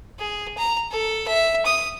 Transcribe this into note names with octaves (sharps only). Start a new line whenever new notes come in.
G#4
A#5
A4
E5
D#6